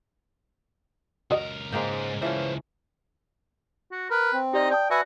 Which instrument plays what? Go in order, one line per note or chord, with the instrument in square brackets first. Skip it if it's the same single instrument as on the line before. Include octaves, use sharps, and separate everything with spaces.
[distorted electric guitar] C#2 A#4 [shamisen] F#4 D#5
[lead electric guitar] G#2 C5 [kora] G#3 A#3 G5
[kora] E3 F3 C#4 [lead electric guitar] C5 C#5
[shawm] F#4
[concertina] A#4 [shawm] B4
[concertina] C4
[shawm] D#4 [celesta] G4 D5 F6
[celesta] D5 A5 D#6 [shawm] G5
[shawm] F#4 [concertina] B4 E5 G#5